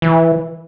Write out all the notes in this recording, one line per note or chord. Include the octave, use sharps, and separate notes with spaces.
E3